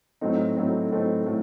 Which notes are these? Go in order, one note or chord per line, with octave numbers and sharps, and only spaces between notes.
A2 F#3 A3 C4 D#4
A2 F#3 A3 C4 D#4
A2 F#3 A3 C4 D#4
A2 F#3 A3